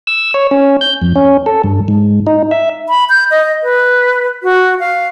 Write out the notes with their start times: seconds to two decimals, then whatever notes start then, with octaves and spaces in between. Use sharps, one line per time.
0.07 E6
0.34 C#5
0.51 C#4
0.81 G6
1.02 F2
1.16 C#4
1.46 A4
1.64 G2
1.88 G#2
2.27 D#4
2.51 E5
2.89 B5
3.10 G6
3.31 D#5
3.63 B4
4.43 F#4
4.79 F5